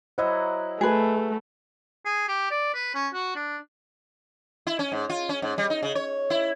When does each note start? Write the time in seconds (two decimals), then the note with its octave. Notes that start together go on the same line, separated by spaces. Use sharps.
0.18 F#3 E4 C5 D#5 F#5
0.81 A3 G#4 B4
2.05 G#4
2.28 G4
2.51 D5
2.74 B4
2.95 C#4
3.13 F#4
3.36 D4
4.67 E4
4.79 C#4
4.92 G#2
5.10 F4
5.29 C#4
5.42 G#2
5.58 G3
5.70 D#4
5.83 C#3
5.95 C#5
6.30 E4